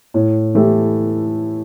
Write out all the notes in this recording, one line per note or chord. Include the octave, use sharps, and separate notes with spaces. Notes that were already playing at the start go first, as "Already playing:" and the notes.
A2
E3 A3 E4 G4